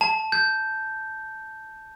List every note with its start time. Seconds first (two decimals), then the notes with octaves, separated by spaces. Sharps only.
0.01 A5
0.32 G6